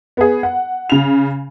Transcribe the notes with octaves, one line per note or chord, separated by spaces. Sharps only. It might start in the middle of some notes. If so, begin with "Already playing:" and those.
B3 G#4
F#5
C#3 F7